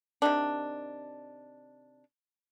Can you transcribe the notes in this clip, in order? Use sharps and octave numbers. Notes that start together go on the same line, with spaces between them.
C3 D#3 D4